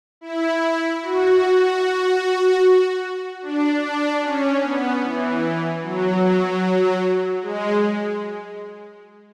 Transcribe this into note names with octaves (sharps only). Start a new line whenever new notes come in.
E4
F#4
D4
D4
C#4
B3
E3
F#3
G#3